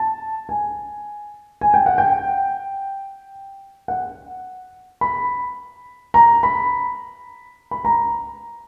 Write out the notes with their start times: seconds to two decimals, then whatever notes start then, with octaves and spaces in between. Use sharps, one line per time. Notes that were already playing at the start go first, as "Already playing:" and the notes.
Already playing: A5
0.49 G#5
1.61 G#5
1.74 G5
1.86 F#5
1.98 G5
3.88 F#5
5.01 B5
6.14 A#5
6.43 B5
7.71 B5
7.85 A#5